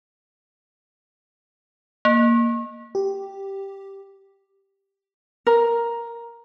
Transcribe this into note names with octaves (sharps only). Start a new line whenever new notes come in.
A#3
G4
A#4